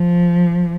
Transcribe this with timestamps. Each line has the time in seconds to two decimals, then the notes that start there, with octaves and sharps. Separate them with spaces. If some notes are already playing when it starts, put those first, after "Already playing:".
Already playing: F3